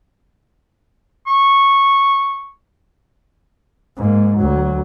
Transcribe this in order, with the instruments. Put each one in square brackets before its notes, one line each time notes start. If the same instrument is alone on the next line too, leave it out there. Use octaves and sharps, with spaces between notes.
[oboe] C#6
[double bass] G#2 A#3
D2 F#3